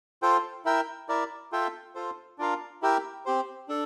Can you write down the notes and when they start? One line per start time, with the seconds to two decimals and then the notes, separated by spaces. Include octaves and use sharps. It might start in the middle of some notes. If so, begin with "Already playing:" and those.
0.22 F4 A4 C5 G5
0.65 E4 A#4 E5 G5
1.09 E4 A#4 D5
1.52 F4 A4 E5 G5
1.95 F4 A4 C5
2.38 D4 F4 A#4 F5
2.82 E4 G4 A#4 E5 G5
3.26 C4 G4 C5
3.68 D4 A4